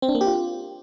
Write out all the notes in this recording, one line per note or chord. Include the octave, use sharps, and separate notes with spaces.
C4
D4
A#3
G4
F4